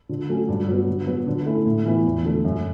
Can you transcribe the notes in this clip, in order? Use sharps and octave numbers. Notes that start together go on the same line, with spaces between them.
D3
F#3 A3 C#4
G2
F#3 B3
D3
F#3 B3 F#4
D3
A3 C#4 E4
A2
E3 B3 E4
E2
D3 A3
F#2